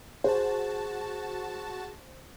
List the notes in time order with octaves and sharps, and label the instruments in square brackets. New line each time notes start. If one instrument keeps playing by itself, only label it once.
[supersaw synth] F#4 A5 [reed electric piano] G#4 [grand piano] C5